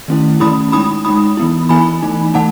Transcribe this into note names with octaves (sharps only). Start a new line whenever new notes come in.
D#3 A3 C#4 E4
D#3 A3 C#4 E4 B5 D#6
G#3 D#4 B5 D#6
G#3 D#4 B5 D#6
E3 B3 E4
E3 B3 E4 G#5 B5
E3 A3 D#4
E3 A3 D#4 F#5 A5